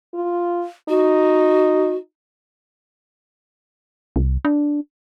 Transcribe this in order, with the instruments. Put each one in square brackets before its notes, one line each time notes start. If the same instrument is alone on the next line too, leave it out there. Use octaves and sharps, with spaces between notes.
[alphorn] F4
[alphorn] D#4 [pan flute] F#4
[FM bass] C2
D4